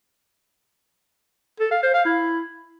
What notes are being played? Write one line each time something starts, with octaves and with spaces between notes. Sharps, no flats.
A4
F5
C5
F5
E4